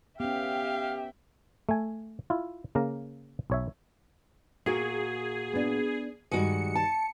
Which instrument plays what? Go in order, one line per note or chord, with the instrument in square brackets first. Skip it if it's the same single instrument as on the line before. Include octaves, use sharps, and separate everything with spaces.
[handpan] B3 C#4 [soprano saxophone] G4 [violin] E5 G5 [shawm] F5
[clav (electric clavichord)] A3 G#5
E4 F4
C#3 A#3 F5 A#5
B1 C#5 E5
[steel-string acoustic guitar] A#2 F#4 [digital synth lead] G#4 [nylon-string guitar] A#4
[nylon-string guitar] B3 D4
[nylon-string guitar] G2 D#3 G3 [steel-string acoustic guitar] G#3 F#4 [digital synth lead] C#7
[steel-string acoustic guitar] A5